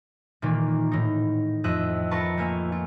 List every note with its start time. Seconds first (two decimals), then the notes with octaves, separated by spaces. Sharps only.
0.42 A#2 D#3 E3 A#3
0.92 A2 D#4
1.64 F2 D#5 E5 F#6
2.11 F4 A#4 B4 A5 C#6
2.38 A3 A#3 F5 G#5
2.72 F4